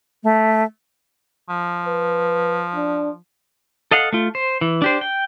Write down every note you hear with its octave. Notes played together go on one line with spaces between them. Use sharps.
A3
F3
B4
D4
A4 D#5 F5 F#5
A3 F4
C5
E3
D4 G4 C5
G5